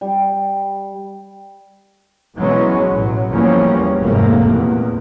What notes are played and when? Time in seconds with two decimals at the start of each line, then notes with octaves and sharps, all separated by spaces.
0.01 G3
2.35 B2 E3 F#3 G#3 B3 C#4
2.92 A1 F#3
3.30 E2 F3 G3 A#3 C#4
4.02 F1 F2 G#2 C3 A3 A#3
4.46 E2 A#2